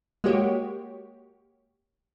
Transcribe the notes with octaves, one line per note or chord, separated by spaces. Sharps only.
G#3 A#3 F#4 G4 C#5